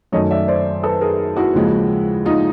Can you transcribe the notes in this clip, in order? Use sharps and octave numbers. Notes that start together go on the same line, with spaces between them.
F#2 D#3 F#3 A3 C#5 D#5
D5 E5
C5 D5
A4 B4
G#4 A#4
E4 F#4
D#2 C#3 F3 G#3
D#4 F4